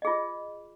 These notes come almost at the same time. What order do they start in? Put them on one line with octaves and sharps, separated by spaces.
D#5 G#4 F4